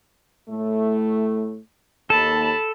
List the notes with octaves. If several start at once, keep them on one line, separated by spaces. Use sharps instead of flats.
A2 A3
D#2 A4 A5 B5